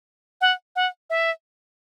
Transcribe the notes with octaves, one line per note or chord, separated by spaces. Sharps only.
F#5
F#5
E5